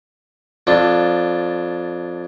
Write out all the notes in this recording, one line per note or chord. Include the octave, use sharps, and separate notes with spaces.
F2 D4 F4